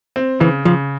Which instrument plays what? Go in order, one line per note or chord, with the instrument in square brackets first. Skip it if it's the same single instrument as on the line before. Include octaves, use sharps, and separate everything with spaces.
[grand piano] C4
[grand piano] C#3 [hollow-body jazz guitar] E3
[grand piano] C#3 [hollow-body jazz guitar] F3